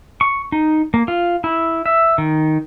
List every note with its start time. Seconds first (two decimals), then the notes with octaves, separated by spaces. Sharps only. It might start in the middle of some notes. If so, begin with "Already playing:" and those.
0.21 C#6
0.52 D#4
0.94 A#3
1.08 F4
1.44 E4
1.86 E5
2.18 D#3